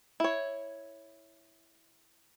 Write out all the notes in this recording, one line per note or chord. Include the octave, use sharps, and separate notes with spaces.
E4 C#5